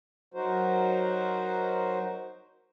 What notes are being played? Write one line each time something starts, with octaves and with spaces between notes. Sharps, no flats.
F#3 D#4 F#4 A#4 C5